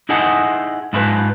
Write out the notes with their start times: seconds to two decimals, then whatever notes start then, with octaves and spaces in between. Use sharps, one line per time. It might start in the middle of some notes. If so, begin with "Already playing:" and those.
0.09 D#4 E4 G#4 D#5 F#5 A5
0.93 G#2 E4 F4 B4 A5